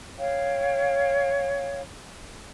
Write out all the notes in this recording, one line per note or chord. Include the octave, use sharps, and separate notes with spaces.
C#5 F5 G5